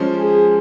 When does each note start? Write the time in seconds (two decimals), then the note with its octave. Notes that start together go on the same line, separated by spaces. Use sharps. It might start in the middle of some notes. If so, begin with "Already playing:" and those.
Already playing: F3 G#3 C#4
0.16 G#4